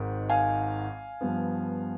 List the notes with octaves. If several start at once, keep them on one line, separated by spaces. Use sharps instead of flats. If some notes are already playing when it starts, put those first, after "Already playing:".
Already playing: G#1 G#2 D#3
F5 G#5
G2 F3 B3